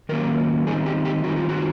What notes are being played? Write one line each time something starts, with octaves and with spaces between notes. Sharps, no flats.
D#3 F#3 A#3 C#4 A#4
D#3 G3 C4 D#4 G#4
G4
G4
D#3 G3 C4 D#4 F#4
F4
F#4